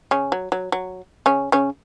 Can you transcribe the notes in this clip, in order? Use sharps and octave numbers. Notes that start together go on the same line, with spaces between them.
C#3 C#4
F#3
F#3
F#3
C#3 C#4
C#3 C#4